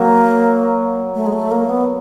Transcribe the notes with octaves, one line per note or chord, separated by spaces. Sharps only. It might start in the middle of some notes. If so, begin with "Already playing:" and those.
Already playing: F#3 A#3
A3
G#3
A3
A#3
B3